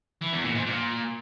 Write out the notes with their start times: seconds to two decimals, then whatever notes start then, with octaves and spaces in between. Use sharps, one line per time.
0.21 E3
0.33 E2
0.44 A#2
0.55 G#2
0.66 A#2